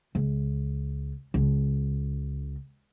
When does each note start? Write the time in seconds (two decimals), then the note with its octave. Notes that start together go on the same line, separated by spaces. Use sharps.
0.15 C#2
1.34 C#2